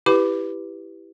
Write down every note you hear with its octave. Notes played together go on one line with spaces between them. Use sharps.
E4 G4 B4 D6